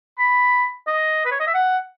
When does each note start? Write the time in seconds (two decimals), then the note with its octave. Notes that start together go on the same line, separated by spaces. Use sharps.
0.18 B5
0.87 D#5
1.25 B4
1.31 C#5
1.40 D#5
1.47 E5
1.54 F#5